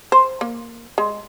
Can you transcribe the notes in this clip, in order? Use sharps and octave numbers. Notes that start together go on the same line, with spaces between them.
C5
A#3
G#3